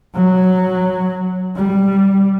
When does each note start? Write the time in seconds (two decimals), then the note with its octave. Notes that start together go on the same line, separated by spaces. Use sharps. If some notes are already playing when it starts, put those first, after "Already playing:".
0.15 F#3
1.56 G3